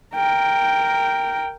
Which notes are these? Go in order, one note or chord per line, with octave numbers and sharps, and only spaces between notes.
A#4 G5